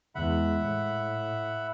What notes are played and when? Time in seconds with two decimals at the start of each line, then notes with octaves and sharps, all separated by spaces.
0.15 E2 G#3 E5 F#5 B5
0.62 A2